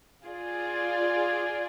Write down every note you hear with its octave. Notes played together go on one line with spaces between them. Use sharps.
F4 G#4 D5